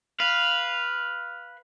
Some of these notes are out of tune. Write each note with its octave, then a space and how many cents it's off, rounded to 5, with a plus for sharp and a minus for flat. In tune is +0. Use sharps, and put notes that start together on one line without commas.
B4 -10 F5 +0